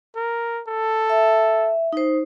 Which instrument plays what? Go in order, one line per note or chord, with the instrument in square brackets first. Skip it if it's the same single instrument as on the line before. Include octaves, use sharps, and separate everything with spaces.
[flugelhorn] A#4
A4
[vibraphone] E5
D#4 C5